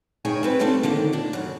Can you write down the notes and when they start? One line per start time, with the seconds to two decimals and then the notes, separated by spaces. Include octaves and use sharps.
0.25 G2 D#3 G#4 C#5 G5 G#5
0.43 G#3 C4 B4
0.59 C#3 G3 A3 C4 D4 A4
0.83 D3 D#3 F3 A#3
1.13 D#2 D4
1.33 F#2 C#3